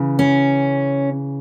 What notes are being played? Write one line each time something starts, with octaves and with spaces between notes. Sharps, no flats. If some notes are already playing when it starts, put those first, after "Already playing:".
Already playing: C#3 E3
C#4